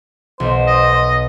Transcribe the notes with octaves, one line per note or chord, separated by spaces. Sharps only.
B1 C5
D#5